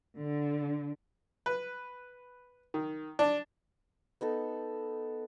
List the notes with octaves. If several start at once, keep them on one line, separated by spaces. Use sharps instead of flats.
D3
B4
D#3
D4
B3 D#4 A4